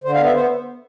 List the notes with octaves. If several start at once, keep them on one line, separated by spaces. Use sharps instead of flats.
D3 C5
F5
B3 E5
B3 C5